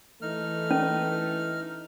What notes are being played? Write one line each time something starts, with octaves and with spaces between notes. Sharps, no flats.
E3 A3 D#4 F6
C#4